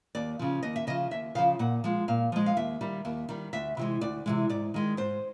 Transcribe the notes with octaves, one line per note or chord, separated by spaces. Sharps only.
D#2 D5
C#3 F3
D#2 D#5
E5
C#3 F3 D#5
D#2 E5
C#3 F3 F5
A#2 F#5
F3 G#3
A#2 F5
F3 G#3
F5
D#2 E5
D#3 G3
D#2
D#3 G3
D2 E5
C3 E3 G#3
D2 D5
C3 E3 G#3
G#2 D5
D#3 G#3
G#2 C5